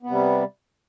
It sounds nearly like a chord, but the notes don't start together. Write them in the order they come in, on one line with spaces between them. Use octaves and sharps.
B3 C3 G3